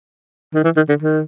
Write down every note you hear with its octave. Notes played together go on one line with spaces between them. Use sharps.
D#3
E3
D#3
D3
D#3